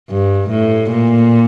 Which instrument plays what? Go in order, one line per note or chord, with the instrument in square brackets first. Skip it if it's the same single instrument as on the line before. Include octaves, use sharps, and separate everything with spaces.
[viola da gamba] G2
A2
A#2